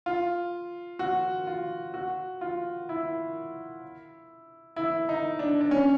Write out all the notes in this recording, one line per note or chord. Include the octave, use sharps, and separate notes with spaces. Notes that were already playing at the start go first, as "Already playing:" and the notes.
F4
F#4
F4
F#4
F4
E4
E4
D#4
D4
D4
C#4